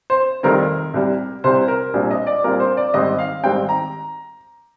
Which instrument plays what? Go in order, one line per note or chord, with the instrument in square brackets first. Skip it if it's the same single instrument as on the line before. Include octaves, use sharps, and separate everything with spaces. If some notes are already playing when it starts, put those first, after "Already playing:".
[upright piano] C5
F1 F2 D#3 G3 C4 A#4
C2 C3 G3
C2 C3 G3 C5
A#4
A#1 A#2 G3 C4
D#5
D5
A#1 A#2 G3 C4 A#4
C5
D5
G#1 G#2 D#3 G3 C4 D#5
F5
G#1 G#2 D#3 G3 C4 G5
A#5